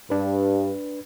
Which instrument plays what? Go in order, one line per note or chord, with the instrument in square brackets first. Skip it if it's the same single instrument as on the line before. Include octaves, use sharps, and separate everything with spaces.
[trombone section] G2 [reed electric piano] D4 B4